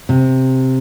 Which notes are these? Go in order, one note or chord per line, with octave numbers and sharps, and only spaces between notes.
C3